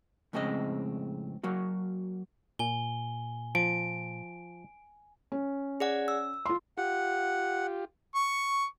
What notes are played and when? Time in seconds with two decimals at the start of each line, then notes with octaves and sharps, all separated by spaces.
0.33 F2 A2 C#3 G#3 C4 D#5
1.43 F#3 A#3 F#4
2.59 A#2 G#5 G7
3.55 F3 D7
5.32 C#4
5.80 G#4 D5 F#5
6.08 E6
6.46 F4 C6
6.78 F4 G4 F#5
8.15 C#6